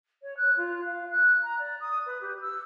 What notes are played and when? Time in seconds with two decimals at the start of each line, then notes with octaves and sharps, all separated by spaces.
0.22 C#5
0.37 F#6
0.57 F4
0.85 F5
1.11 F#6
1.43 A#5
1.59 D5
1.80 D#6
2.06 B4
2.21 G4
2.41 E6